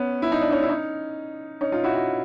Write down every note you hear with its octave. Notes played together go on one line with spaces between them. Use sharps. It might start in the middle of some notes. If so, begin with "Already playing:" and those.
Already playing: B3 C#4
E4
D#4
D4
C#4 D#4
E4
C#4 D#4
C#4 D#4
D#4 F4
E4 F#4
F#4